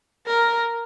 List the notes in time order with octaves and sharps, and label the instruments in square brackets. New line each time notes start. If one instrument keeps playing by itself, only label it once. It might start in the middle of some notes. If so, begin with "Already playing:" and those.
[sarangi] A#4